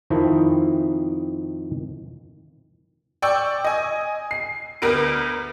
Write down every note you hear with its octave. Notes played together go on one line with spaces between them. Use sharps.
F2 D#3 C4 D#4 E4 A4
D5 G5 C#6 E6
D#5 G#5
C7
D2 B3 A#4 B4 D7